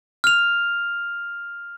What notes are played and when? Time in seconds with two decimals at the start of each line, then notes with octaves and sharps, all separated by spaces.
0.24 F6 F7